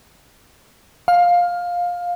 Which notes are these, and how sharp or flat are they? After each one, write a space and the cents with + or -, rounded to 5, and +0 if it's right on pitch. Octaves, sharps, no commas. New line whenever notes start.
F5 +15